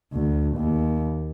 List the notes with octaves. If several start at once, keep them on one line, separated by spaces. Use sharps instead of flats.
D2
D#2